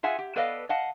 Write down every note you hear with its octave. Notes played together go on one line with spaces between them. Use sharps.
F4 G#4 E5 F#5 G#5
G4
B3 A4 B4 D5 D#5 F5
D#5 F5 F#5 A5